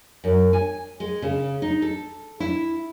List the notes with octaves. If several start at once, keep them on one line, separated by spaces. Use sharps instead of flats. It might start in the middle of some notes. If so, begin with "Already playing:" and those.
F#2
G#5
G#3
C#3
D#4
A4
E4